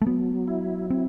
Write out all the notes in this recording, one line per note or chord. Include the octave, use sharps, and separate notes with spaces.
A3
F#3 B3
E4
C4 E4